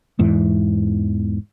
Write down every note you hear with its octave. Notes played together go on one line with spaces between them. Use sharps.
E2 G#2 E3